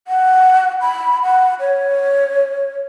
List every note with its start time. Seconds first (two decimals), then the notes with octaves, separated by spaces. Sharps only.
0.08 F#5
0.81 B5
1.23 F#5
1.60 C#5